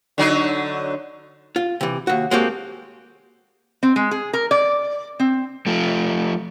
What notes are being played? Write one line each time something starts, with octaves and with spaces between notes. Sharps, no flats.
D3 F#3 D#4
F4
C3 E3
D#2 F#4
G#3 A#3 C4 F#4 G4 A4
C4
G#3
G#4
A#4
D5
C4
F3 A3